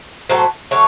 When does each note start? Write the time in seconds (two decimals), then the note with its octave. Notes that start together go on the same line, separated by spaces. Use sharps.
0.30 A2 F#3 A3 C5
0.71 D3 F#3 A3 C#5